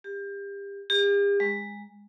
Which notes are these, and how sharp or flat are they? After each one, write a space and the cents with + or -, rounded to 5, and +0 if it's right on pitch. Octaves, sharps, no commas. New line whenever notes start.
G4 +30
G4 +45
G#3 -20